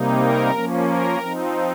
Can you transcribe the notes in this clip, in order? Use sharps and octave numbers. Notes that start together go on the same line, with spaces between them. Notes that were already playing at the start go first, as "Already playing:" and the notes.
Already playing: C3 G3 A#3 D#4
A#4
F3 A#3 C#4
A#4
F3 C4 D#4